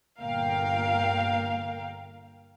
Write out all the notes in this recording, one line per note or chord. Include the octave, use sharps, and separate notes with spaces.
G1 A#2 A#4 F5 G5